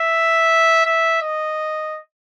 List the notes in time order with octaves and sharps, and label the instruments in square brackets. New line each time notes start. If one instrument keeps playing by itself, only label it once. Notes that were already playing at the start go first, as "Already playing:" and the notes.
Already playing: [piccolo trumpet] E5
E5
D#5